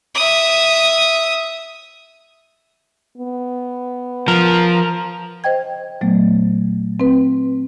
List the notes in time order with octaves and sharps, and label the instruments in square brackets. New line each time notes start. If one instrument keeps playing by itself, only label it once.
[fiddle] E5 D#6
[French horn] B3
[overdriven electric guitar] F3 [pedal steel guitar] A#4
[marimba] C5 D#5 G5 G#6
A#2 F#3 A3 B3
C4 B4